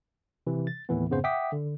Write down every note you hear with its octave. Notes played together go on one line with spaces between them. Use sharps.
C3 E3
A6
D#2 A2 E3 B3
F2 G#2 C#3 B3 C5
E5 F#5 G5 D6 D#6 B6
D3